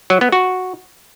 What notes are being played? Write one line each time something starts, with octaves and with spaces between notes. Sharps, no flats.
F#3
B3
F#4